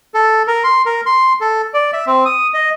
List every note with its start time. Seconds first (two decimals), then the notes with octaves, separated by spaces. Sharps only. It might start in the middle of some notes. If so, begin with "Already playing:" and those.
0.14 A4
0.47 A#4
0.64 C6
0.86 A#4
1.06 C6
1.41 A4
1.74 D5
1.93 E5
2.07 C4
2.25 D#6
2.54 D#5